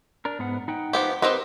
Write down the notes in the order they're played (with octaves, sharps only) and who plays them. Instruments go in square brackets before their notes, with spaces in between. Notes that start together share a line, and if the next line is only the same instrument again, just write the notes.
[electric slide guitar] D4 A#4
G#2 B3 F#5
D#4 F#5 G5
[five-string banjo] F3 B3 G4
[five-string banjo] C4 D#4 B4 [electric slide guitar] G4 A#4